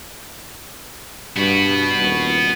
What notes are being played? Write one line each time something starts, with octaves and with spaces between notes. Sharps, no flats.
G2 B3 F#4
D#1